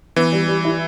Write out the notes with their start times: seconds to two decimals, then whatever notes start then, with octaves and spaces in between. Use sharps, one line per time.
0.16 E3 B3
0.32 G3
0.48 G3
0.65 E4